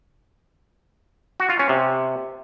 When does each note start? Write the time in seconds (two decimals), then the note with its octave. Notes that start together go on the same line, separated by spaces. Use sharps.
1.40 F#4
1.50 F4
1.59 C#4
1.69 C3